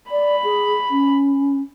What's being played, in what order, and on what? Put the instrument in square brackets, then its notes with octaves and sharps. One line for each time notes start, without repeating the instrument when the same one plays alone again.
[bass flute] D5 [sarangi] B5
[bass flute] G#4
C#4